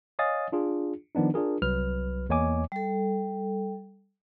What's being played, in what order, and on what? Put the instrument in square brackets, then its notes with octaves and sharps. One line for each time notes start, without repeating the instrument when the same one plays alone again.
[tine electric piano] C#5 D#5 F5 G#5 D#6 A6
D4 F4 G#4
D#3 F3 B3 D4 D#4
D4 F4 G#4 A#4
C2 F#3 B4 F6
E2 A#3 C#5 D#5 G#5 D6
[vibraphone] G3 A4